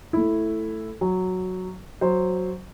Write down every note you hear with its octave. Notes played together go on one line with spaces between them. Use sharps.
A3 E4
F#3
F#3 C5